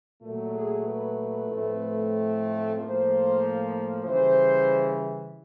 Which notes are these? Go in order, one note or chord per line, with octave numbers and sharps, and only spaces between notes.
A#2 F#3 A3
G#4
B4
A2 F3 A3 C4
A2 F3 A#3 C5
C#3 E3 G3 C5